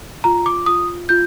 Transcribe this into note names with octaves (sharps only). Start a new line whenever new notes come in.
F4 A#5
D6
F4 D#6
F4 G6